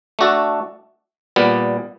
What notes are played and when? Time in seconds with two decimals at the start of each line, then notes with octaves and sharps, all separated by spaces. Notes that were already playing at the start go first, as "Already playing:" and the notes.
0.19 A3 D4 F#4 A4
1.36 A#2 G3 B3